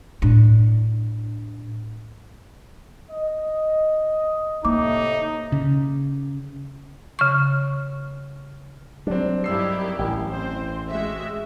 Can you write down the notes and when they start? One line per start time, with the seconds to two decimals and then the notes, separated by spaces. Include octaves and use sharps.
0.22 A2 D4
3.10 D#5
4.65 A2 C3 A#3 D#4 E4 D6
5.52 C#3
7.19 C#3 C#6
9.07 F#3 G3 C4 D4
9.44 G2 D#3 E4 G4 E6 C7
9.99 A1 G5
10.31 C4 C5
10.88 G#3 F#4 E5